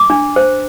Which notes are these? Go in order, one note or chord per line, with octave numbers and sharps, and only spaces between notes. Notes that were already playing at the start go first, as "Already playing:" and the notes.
Already playing: D6
D4
C5